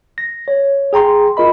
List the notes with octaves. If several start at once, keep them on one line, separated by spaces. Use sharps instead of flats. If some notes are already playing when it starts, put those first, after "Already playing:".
A#6
C#5
G#4 G5 A#5 C6
F4 A#4 D#5 B5